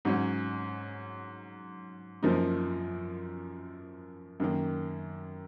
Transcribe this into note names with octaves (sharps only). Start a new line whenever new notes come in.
G#2 F#3 C#4
F#2 F3 A#3 D#4
F#2 D#3 A#3